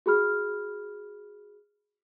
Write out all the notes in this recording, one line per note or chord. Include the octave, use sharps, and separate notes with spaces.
F#4 G#4 B5 F6